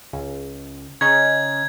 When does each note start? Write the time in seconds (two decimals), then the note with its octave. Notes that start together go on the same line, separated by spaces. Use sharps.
0.13 C#2
1.01 C#3 C#4 D#4 G#6